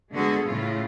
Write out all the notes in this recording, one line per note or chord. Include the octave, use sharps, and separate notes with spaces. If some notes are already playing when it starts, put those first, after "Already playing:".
D3 G#3 B3 F#4 G#4 A4
A2 C#3 F4